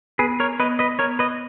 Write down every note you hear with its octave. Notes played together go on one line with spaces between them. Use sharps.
B3 G#4 B4
A#4 C#5
B3 B4 D#5
B4 D#5
B3 A#4 C#5
B4 D#5